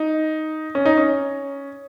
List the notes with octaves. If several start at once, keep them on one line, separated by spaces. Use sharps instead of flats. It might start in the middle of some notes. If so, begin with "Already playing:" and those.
Already playing: D#4
C#4
D#4
C#4